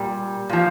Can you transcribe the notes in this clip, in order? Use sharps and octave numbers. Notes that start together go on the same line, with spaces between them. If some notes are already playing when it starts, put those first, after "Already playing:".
Already playing: A#2 G3
A#2 F3